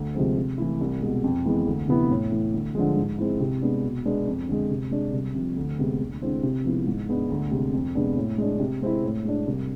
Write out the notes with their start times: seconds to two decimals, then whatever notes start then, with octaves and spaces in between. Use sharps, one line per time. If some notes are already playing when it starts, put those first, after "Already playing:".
Already playing: D2
0.15 C3 F3 G#3 C4
0.37 C3
0.58 E3 A3 E4
0.81 C2
1.02 B2 G#3
1.24 F2
1.46 E3 G#3 B3
1.67 D2
1.88 C3 E3 B3 E4
2.10 A2
2.32 E3 A3
2.54 D2
2.75 D3 F3 G#3
2.96 G#2
3.18 G#3 C4 E4
3.40 C3
3.62 G#3 B3 D4
3.84 B2
4.05 G#3 B3 D4
4.27 F2
4.49 D3 G#3
4.71 C3
4.91 G#3 D4
5.13 C2
5.35 C3 F3
5.57 D2
5.79 C3 G#3 B3
6.00 D2
6.22 D3 G#3 C4 E4
6.43 C3
6.65 F3 G#3 B3 E4
6.86 G#2
7.09 G#3 B3 D4
7.30 D2
7.51 C3 G#3
7.73 F2
7.95 C3 G#3 B3 D4
8.17 A2
8.38 G#3 D4
8.59 C3
8.82 G#3 C4 E4
9.04 A2
9.25 G#3 D4
9.47 C2